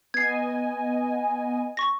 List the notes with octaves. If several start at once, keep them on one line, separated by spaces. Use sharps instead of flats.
B3 D#5 G#5 G#6 C7
C#6 A#6